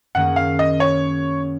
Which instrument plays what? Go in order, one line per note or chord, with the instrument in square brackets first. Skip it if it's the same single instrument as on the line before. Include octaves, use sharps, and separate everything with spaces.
[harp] F#2 D#3 A#3 C#4 G#4 [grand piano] F#5
[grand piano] F5
D#5
C#5